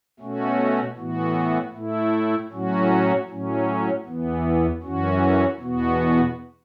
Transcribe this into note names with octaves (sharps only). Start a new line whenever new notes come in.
B2 A3 C#4 F#4
A2 E3 B3 F#4
A2 A3 E4
A2 F#3 C#4 F#4
A2 F#3 C#4
E2 E3 B3
F#2 E3 C#4 F#4
E2 B2 B3 F#4